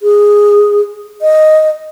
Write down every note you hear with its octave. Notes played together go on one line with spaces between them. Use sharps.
G#4
D#5